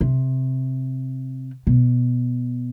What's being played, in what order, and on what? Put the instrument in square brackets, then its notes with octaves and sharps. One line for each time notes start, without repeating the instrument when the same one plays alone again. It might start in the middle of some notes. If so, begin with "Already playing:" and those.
[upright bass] C3
B2